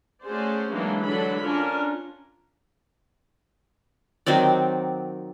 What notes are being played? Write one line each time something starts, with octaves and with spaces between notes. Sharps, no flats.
A3 C#4 F#4 G#4 C5 D5
E3 F#3 G#3 A#3 D4 D#4
D3 F#3 D4 A4 B5
C#4 D4 F4 A#4
D#3 F#3 C4 D5